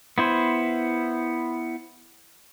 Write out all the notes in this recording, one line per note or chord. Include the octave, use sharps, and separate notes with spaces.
B3 E4 C5